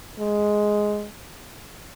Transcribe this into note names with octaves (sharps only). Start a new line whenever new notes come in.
G#3